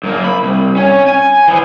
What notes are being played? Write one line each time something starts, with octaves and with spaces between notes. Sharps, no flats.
F#2 A#3
B5
C2
C#4
G#5
E3 F3